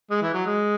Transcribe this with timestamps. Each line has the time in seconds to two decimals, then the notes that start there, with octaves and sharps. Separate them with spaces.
0.11 G#3
0.22 E3
0.34 F#3
0.46 G#3